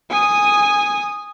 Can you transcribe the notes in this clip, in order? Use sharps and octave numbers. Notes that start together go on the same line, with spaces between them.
G#5 D#6